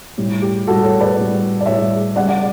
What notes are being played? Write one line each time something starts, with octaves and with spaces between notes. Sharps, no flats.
A2 G3
G4
A2 G3 F#4 A4
A4 C#5
B4 D5
A2 G3
D5
A2 G3 C#5 E5
C#3 G3 D5 F#5
D5 F#5